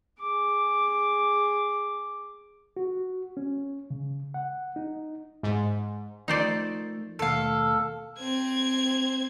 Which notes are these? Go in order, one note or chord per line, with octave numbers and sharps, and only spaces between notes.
G#4 D6
F#4
C#4
C#3
F#5
D#4
G#2
F3 A3 D#4 A#4 C5 D5
D#2 B2 A3 A4 F5
C4 G#6